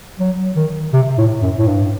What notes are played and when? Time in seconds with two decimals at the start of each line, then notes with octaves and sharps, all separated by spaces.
0.20 F#3
0.56 D#3
0.93 C3
1.18 A2
1.42 F#2
1.59 A2
1.67 G2